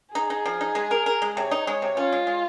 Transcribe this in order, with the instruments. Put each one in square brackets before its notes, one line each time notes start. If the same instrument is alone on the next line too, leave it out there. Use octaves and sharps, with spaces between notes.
[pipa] D#4 [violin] G#4
[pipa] D#4
F3
D#4
G#3
A#4
A#4
G#3
[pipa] C3 [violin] C#5
[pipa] D#4
[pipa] G#3 [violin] C#5
[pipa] C3
[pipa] C#4 [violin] F4
[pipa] G#3
G#3